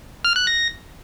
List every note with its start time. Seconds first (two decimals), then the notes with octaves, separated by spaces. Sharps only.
0.25 F6
0.36 F#6
0.47 A#6